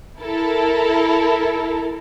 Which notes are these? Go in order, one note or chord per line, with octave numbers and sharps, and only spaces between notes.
E4 A4 A#4